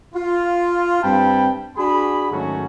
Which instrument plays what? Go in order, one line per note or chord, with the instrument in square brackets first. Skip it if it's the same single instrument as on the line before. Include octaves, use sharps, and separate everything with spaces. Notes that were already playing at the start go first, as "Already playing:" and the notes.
[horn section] F4
G2 C4 G5 A5 B5
D4 F#4 G#4 B5
G#2 D#3 F#3 A3 C#4 F#4